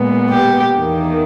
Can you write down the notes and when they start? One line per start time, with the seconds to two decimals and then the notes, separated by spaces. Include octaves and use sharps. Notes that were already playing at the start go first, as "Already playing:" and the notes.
Already playing: A#2 G#3 B3
0.29 G4
0.78 E2 D#3 A#3